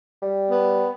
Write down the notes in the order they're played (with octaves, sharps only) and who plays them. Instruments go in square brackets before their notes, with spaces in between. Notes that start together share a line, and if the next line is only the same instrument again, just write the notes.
[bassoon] G3
[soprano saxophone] B3